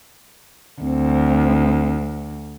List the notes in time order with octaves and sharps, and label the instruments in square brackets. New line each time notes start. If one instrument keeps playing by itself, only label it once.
[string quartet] D2 [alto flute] C4